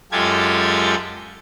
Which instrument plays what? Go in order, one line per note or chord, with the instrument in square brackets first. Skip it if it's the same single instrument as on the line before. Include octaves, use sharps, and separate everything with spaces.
[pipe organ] F#2 G#3 F4 G4 A4 G#6